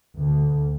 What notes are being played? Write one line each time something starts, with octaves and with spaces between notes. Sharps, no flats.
D2